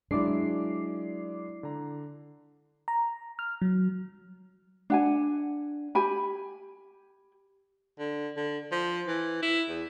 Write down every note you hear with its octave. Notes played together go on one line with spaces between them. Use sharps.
F#3 G#3 D4 E4 D5 D6 C7
D3 A#5
A#5
F6
F#3
D4 F#5 G#5
G4 G#5 B5
D3
D3
F3
E3
E4
E2